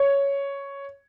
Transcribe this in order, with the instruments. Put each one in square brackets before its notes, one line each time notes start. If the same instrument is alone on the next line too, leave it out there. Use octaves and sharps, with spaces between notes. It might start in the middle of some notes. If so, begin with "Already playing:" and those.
Already playing: [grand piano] C#5